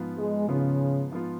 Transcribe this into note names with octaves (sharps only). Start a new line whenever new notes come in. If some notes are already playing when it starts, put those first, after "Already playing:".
Already playing: G#2 F3 B3 F4
G#3
G#2 C#3 F3 B3 F4
G#2 F3 B3 F4